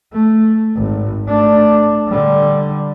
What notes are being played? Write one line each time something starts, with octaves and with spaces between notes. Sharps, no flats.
A3
G#1
A3 D4
D3 G3